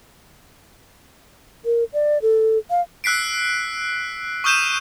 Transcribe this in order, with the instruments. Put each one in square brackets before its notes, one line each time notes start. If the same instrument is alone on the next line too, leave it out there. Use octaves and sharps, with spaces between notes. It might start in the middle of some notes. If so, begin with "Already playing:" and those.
[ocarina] A#4
D5
A4
F5
[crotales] E6 F#6 B6 C7 D7
C#6 D#6 F6 G6 D#7 E7